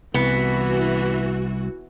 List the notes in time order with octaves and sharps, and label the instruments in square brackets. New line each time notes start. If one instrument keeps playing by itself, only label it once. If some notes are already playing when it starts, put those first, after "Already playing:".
[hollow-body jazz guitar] C2 [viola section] E3 F#4 [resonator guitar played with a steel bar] B3